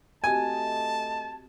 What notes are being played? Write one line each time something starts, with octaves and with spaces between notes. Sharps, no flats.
A3 C4 F#4 G4 D#5 G#5 A5